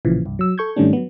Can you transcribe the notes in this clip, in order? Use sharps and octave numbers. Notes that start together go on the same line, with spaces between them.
A1 A#2 C#3 E3 F3
C2 G2
F#3 E6
A4 C#6 G6 G#6
G#2 D#3 G3 A3 C#4 D4
F#3 B3